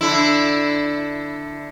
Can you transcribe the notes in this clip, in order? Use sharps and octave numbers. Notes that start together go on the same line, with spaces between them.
D3 E4